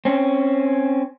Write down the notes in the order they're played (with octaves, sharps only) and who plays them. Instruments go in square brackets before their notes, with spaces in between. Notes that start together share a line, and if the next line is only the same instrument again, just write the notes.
[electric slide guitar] C4 C#4